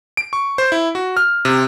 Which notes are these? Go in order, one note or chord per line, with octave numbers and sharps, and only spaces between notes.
D7
C#6
C5
E4
F#4
F6
C3